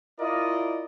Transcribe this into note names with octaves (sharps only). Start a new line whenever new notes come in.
E4 F4 A#4 D5 D#5